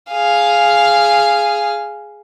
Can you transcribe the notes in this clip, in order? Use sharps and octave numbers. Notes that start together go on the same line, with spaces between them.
G#4 F5